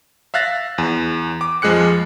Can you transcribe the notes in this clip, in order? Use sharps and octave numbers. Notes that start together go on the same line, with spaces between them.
E5 F5 F#6 A6 A#6
E2
D6
F2 F3 G#3 G#4 F#6 C#7